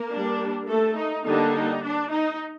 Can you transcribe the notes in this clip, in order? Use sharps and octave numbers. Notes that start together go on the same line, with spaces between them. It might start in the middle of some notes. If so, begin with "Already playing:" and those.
Already playing: A#3 A#4
G3 D4
A3 A4
D#4
D3 G3 A#3 D4 D#4
D#4
D4
D#4